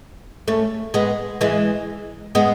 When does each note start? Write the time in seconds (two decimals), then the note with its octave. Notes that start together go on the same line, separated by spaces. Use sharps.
0.48 A3 C#4
0.94 G#3 B3
1.41 E3 G#3
2.35 G#3 B3